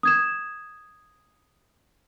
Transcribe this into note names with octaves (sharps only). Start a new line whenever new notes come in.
D#6 G#6 E7